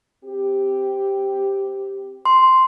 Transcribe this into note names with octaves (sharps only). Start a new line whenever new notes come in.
C4 G4
C6